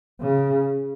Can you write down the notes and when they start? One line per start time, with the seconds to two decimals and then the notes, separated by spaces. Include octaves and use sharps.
0.21 C#3